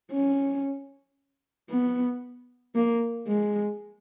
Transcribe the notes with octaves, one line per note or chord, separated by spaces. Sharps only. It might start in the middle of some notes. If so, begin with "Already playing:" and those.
C#4
B3
A#3
G#3